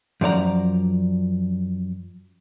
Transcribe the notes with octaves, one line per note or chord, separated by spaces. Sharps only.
F#2 F3 D5 A#5